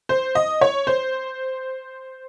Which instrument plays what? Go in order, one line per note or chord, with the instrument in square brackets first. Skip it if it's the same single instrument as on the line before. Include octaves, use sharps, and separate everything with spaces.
[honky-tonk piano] C5
D#5
C#5
C5